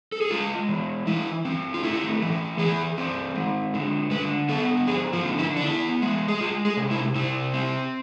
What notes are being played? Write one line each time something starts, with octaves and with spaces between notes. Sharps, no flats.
A4
G#4
G#3 F4
E3
E3 E4
C4
F4
A3 E4
E3
E3 G#4
C4
G#3
D3
D3 B4
B3 A4
F3 G#4
F4
D3
E4
D4
B3 E4
G#3
G#4
G#3 F4
G#4
C3
E4
C3 E4
C4